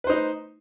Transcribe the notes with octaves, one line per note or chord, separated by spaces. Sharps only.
D#4 B4 C5